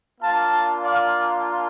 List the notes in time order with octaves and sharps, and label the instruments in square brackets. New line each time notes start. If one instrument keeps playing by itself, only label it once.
[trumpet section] A#3 D4 F4 F5 A5
D5 F5